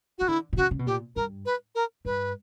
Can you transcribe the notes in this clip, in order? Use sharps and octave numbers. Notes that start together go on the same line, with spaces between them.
E3 F#4
D3 E4
B2
C#3 F#4
C#3
B2
A#2 G4
G2 A#4
B4
A#4
G2 B4